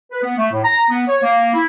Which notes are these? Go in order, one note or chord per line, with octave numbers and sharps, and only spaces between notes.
B4
B3
A3
A2
A#5
B3
C#5
A#3
E4